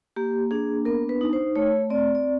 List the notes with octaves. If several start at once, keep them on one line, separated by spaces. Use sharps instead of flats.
A#3 G4
D4 G#4
B3 A#4
B4
D#4
C5
A3 C#5
C4 D5
D5